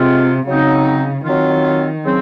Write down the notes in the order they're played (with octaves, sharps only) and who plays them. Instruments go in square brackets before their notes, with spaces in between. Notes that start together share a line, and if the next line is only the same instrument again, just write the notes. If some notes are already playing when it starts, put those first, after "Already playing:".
Already playing: [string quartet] C3 [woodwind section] G#3 C4 F4
[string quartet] C#3 [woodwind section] F#3 C4 D#4
[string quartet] D#3 [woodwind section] F#3 C4 F4
[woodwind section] C#3 F#3 C4